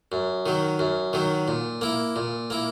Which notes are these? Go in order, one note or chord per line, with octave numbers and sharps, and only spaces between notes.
F#2
D#3 F#3
F#2
D#3 F#3
A#2
A#3 E4
A#2
A#3 E4